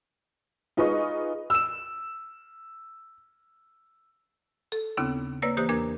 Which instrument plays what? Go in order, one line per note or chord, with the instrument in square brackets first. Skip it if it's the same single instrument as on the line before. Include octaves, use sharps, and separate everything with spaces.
[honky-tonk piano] D#4 F4 G#4 B4 D#5 C#6
[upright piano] E6 E7
[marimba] A4
D#2 C#3 B3 C4 D4 E4
A#3 B4 C#5 D5 E6 A#6
E3 A#3 G4 C5 D#6 F#6
E2 A#3 D4 A#4 D6 G#6